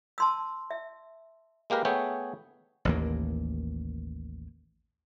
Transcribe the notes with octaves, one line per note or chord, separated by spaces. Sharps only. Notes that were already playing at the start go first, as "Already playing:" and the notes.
A5 C6 E6
E5
G#3 A#3 G4 A#4 B4
A3 B3 G#4 C#5 E5 G5
A1 D#2 A#3